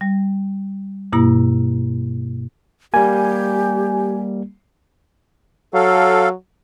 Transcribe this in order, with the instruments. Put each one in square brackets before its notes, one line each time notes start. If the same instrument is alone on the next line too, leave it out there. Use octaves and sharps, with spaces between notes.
[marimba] G3
G2 B2 A#3 E4
[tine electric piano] G3 A#3 [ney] G4 [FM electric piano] G#5
[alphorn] F#3 [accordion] A4 F5